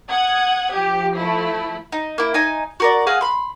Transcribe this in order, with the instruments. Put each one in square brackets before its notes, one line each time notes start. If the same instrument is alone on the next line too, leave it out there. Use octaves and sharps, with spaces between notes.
[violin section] F#5 D#6 G#6
[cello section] F3 [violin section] G4
[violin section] A3 E4
[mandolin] D#4
A#3 E4
D#4 G#5
F#4 A#4 D5
G#4 D#5 F5 F#5
B5 C6